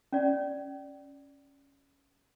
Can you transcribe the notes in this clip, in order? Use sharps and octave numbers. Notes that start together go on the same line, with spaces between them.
C#4 D5